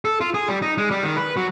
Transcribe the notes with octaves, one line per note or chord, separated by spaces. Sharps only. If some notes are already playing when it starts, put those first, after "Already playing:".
A4
F4
G#4
G3
D#4
G#3
G3
D#3
B4
F#3